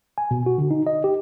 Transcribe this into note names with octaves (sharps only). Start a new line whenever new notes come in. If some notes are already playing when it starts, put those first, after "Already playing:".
G#5
B2
F#4
D3
D#4
D#5
G4